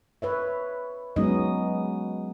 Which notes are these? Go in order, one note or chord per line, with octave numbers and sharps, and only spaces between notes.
B4 C#5 E5
F#3 G#3 B3 C#4 D#4 D#5